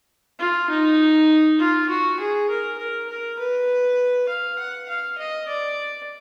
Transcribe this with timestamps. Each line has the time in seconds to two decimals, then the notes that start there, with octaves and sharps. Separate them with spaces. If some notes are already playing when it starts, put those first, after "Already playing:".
0.39 F4
0.70 D#4
1.58 F4
1.89 F#4
2.19 G#4
2.49 A#4
2.78 A#4
3.09 A#4
3.39 B4
4.29 F5
4.58 F#5
4.88 F5
5.18 D#5
5.48 D5